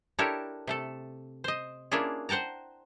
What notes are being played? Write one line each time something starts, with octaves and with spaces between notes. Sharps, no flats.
D4 E4 G4 A4 A#4 C#5
C3 A3 A4
C5 D#5
A#3 C#4 D4 E4 F4 G#4
C5 F#5 G5 A5 A#5